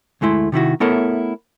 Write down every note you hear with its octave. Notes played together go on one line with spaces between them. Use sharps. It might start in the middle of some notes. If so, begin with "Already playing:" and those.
D2 G#3 A3 E4 C6
C3 D#3 E4 F#4
A3 B3 E4 A4 A#4 C#5